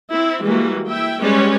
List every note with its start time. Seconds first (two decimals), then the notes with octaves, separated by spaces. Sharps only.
0.12 C4 E4
0.42 E3 G3 G#3 A#3 F#4
0.88 E4 E5 G5
1.21 G3 G#3 C#4 G4 B4 C#5